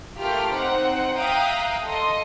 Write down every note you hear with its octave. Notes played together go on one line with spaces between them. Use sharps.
A3 F4 G4 A#4 F6
C4 D#4 C5 F#5
E5 F5 G5 A#5 D#6 F#6
A4 D#5 C6